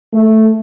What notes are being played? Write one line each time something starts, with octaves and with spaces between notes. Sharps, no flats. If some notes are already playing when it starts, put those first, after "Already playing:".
A3